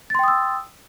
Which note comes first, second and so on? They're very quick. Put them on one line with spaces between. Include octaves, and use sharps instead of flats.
A6 C6 G5 D#6 E6